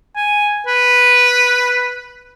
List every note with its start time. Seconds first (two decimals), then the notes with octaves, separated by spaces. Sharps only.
0.16 G#5
0.67 B4